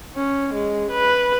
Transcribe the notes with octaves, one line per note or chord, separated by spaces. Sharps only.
C#4
G#3
B4